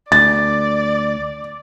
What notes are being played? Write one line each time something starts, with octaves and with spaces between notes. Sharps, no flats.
D2 D5 A6